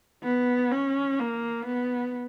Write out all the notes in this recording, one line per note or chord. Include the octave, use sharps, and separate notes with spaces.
B3
C#4
A#3
B3